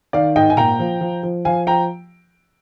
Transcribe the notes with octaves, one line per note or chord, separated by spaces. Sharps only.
D#3 D5 F5
G#2 D#5 G5
G#5
A#2 G5 A#5
F3
F3
F3
F3 F5 G#5
F3 G5 A#5